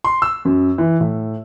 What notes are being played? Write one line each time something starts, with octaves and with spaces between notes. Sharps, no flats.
C6
E6
F#2
E3
A2